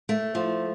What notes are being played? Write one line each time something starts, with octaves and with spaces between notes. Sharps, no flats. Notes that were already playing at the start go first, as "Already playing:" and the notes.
A3
F3